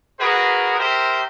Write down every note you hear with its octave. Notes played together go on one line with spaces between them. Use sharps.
F#4 G#4 A#4 B4 D#5
G4 A#4 C5 E5